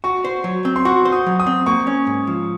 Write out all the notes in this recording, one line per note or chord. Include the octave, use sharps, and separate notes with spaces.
F#4 C#6
C5
F#3
C4
C6
F#4 C#6
C5
D#6
F#3
D#6
C4
A#3 C#6
C#4
G#2
F3